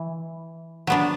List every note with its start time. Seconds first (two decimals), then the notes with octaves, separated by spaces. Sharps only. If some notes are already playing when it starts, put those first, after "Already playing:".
Already playing: E3
0.87 F#3 B3 D4